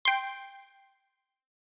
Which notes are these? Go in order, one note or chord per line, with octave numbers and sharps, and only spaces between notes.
G5 C6